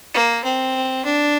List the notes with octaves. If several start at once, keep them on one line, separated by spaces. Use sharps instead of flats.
A#3
C4
D4